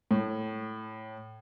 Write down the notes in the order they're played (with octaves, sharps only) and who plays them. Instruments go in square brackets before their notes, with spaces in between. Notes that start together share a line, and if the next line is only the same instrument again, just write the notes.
[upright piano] A2